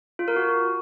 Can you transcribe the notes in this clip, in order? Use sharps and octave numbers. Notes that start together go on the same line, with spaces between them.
F4
A#4
F#4